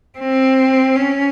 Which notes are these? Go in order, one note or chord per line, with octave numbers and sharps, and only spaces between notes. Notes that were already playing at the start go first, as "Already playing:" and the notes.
C4
C#4